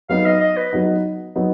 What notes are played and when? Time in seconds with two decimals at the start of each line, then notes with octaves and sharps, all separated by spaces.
0.09 F#3 B3 D#4 F5
0.26 D#5
0.41 D#5
0.57 B4
0.73 F#3 B3 D#4
1.36 F#3 B3 D#4